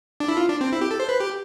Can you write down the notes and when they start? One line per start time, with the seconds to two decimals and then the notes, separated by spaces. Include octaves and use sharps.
0.20 D4
0.28 E4
0.37 F4
0.48 D4
0.61 C4
0.72 E4
0.81 G4
0.91 A4
1.00 C5
1.09 B4
1.20 G4